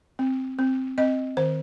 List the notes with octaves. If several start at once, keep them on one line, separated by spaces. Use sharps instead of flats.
C4
C4
C4 D#5
D#3 C5